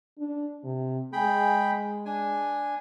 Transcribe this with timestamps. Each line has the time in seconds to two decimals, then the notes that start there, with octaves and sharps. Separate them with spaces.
0.18 D4
0.64 C3
1.13 G#3 G#4 G5 B5
2.05 D4 G#5